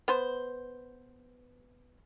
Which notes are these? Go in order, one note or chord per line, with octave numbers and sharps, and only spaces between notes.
B3 C5